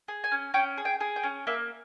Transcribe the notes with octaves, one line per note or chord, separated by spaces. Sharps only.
G#4
G#5
C#4
C#4 G5
G#4
G5
G#4
G5
C#4
A#3 E5